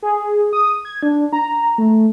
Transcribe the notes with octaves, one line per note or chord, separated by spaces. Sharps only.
G#4
D#6
G#6
D4
A#5
A3